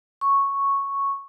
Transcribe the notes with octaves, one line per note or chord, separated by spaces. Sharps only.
C#6